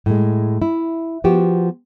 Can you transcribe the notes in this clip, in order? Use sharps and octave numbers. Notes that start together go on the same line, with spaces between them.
A2 G#3
E4
F3 B3 F#4 G4